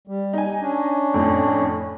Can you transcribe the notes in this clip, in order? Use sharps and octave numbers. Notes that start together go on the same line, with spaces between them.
G3
D#4 G#5
C#4 D4
F2 A2